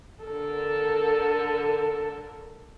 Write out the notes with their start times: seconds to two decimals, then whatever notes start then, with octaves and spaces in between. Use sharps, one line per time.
0.24 D3 A4 A#4